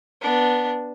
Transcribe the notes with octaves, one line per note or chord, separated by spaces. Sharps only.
B3 D4